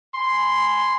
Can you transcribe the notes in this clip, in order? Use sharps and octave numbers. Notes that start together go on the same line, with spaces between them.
G#5 B5 C6